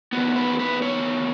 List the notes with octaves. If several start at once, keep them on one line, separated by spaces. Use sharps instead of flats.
E2 D#3 F#3 B3 B4
B4
B4
C#5